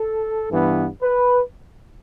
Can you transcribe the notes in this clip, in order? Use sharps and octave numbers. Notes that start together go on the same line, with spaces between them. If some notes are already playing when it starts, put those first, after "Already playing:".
Already playing: A4
G2 E3 B3
B4